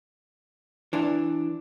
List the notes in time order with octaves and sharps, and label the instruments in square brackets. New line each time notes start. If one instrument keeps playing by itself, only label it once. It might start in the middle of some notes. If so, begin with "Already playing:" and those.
[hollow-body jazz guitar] E3 D4